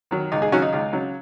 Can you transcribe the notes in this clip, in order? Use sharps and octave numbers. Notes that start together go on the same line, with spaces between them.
D#3 F#3
C#2 D#4
D#4 G#4
C#3 F#3 C#4 F#4
D#4
C#2 D#4
C#3 F#3